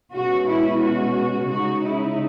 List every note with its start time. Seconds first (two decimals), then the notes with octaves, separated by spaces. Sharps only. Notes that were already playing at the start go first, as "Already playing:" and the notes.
0.13 B2 G#3 C#4 F#4
0.47 E4
0.81 F#4
1.49 C#3 G#3 D#4 F#4
1.84 E4